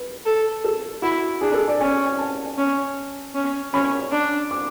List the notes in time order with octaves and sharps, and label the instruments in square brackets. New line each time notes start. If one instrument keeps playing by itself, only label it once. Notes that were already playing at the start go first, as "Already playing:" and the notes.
Already playing: [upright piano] B4
[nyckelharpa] A4
[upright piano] A4
[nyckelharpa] E4 [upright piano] F#4
[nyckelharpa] D4 [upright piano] G#4
[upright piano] A4
D5
[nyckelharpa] C#4 [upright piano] G#5
[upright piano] G#5
A5
[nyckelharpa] C#4
C#4
[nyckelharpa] C#4 [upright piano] B5
[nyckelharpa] D4
[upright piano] D6